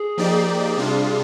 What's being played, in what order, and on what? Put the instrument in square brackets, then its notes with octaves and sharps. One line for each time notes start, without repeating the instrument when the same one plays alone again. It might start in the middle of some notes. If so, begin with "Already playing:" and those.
Already playing: [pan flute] G#4
[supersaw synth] F3 A#3 D#4 G4 D5
[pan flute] G#4
[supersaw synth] C3 G3 D4 F4